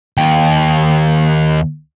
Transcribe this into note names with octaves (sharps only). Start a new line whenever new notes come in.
D#2 G5